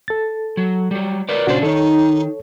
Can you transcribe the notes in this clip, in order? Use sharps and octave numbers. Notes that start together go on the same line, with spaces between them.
A4 A6
F#3
F#3 G3
A#4 B4 D5
A#2 C#3 D4 F#4 C5 D5
D#3 D#4 A4 C#5